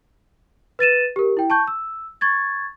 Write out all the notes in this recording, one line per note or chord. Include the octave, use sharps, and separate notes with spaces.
B4 A6 D#7 E7
G4 A#4
E4 G5
A5 C#6 G6
E6
C#6 G#6 A6